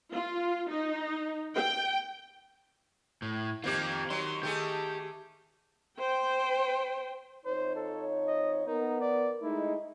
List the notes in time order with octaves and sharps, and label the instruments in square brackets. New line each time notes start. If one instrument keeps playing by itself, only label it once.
[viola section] F4
D#4
G5
[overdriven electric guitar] A2
[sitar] D#3 A#3 G4 [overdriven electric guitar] C4 F4
[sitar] D#3 F#3 [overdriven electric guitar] C6
[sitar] D#3 A3 G#4 [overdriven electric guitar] G4
[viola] C5 G5
[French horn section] F2 D#4 C#5 [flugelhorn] C5
[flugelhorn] A4
D#5
[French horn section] B3 A#4 [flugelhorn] D#4
[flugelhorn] D5
[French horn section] G#3 A3 D#4 [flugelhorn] E4